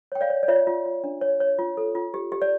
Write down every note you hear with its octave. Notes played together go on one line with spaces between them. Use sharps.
C#5 G5
D5 F5
C#5
D5
F4 C#5 E5
F4
F4
D4
C#5
C#5
F4
A4
F4
G4
G4
D5